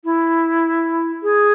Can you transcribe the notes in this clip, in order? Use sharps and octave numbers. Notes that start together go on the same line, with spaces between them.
E4
G#4